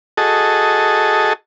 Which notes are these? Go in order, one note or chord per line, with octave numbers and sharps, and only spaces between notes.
F#4 G#4 A4 D#5 A5